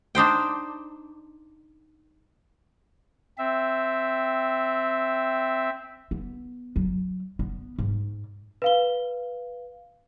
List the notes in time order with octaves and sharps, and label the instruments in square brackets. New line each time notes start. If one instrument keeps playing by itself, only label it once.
[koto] D4 D#4 C5 G5
[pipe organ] C4 E5
[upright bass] B3
F#3
B3
G#2
[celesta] B4 F5 G7